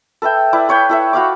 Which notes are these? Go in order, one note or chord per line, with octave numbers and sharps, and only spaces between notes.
A4 B4 E5 G5
E4 B4 D5
B4 C#5 F5 G5
E4 A4 E5
F#4 F5 B5 D6